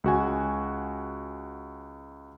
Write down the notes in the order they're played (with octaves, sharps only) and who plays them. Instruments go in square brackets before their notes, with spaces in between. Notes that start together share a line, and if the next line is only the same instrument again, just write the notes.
[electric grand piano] C#2 F#4 G#5